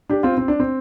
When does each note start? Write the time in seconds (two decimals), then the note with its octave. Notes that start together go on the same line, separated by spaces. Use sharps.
0.09 D4 G4
0.23 C4 F4
0.37 C4
0.48 D4
0.60 C4